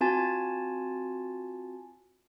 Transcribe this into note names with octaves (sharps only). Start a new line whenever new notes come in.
C4 F4 F#4 G#5 A5 A6